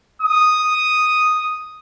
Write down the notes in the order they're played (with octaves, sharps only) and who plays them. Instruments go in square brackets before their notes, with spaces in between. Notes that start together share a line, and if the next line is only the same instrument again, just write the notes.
[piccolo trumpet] D#6